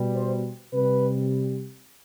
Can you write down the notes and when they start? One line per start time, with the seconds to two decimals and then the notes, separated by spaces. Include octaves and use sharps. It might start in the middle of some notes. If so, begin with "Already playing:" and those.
Already playing: B2 G3
0.15 C5
0.73 C3 G3 B4